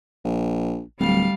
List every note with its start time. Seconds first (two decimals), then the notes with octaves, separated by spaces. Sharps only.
0.24 A#1
1.00 D1 G3 F5